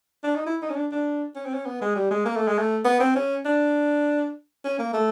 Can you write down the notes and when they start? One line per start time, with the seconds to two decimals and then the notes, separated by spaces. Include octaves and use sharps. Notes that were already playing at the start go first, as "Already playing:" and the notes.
0.23 D4
0.36 D#4
0.46 E4
0.62 D#4
0.70 C#4
0.76 D4
0.91 D4
1.36 C#4
1.45 C4
1.54 C#4
1.66 B3
1.81 G#3
1.95 G3
2.11 G#3
2.25 A#3
2.36 A3
2.48 G#3
2.58 A3
2.85 B3
3.00 C4
3.15 C#4
3.45 D4
4.65 C#4
4.79 A#3
4.93 A3